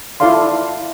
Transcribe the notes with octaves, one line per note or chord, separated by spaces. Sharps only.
E4 F4 A4 D5 F5 C6